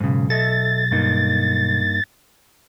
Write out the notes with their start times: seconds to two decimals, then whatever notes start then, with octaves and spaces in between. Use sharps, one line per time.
0.01 B1 F2 G#2 C#3
0.30 A4 D#5 E5 A6
0.91 G2 A#3 D#4